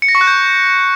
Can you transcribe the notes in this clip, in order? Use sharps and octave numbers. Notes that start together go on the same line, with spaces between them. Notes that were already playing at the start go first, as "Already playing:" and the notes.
C#7
A#6
C#6
F#6
G6